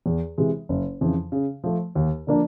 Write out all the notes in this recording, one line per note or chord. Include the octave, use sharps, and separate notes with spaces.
E2
C3 E3 G#3
F#1
F2 C#3 E3
C#3
F3 A3
D#2
D3 F3 A#3 D4